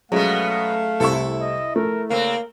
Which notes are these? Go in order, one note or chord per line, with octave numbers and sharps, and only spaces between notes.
B2 F#3 G#3 A3 B3 C#4 F5
C2 C3 E4 A4 C#6
D#5
A3 A#4
C#3 A#3 C4 A#4